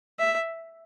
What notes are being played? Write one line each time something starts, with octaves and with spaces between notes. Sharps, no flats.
E5